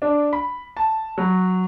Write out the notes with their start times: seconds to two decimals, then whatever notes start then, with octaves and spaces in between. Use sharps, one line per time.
0.02 D4
0.33 B5
0.77 A5
1.18 F#3